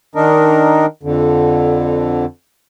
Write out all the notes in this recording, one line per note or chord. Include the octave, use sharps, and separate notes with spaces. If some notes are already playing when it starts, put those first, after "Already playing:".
D#3 D4 D#4 A#4
F2 D3